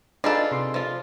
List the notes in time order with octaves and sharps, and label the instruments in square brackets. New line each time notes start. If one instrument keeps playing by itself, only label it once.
[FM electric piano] D4 [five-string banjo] D#4 F4 A4 [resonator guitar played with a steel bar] G#4 B4 D5
[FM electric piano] C3 C6
[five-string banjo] F3 F4